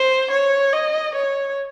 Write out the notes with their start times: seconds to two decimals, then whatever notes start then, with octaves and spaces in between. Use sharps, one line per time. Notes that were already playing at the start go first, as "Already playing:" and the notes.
Already playing: C5
0.31 C#5
0.73 D#5
1.15 C#5